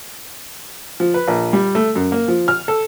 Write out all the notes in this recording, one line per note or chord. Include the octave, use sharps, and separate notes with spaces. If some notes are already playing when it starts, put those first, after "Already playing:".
F3
B4
A#1
G3
A3
F#2
A#3
F3
F6
A4